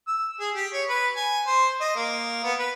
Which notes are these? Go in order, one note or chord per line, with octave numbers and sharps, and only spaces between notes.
E6
G#4
G4
C#5
B4
G#5
C5
D#5
A#3
B3
B4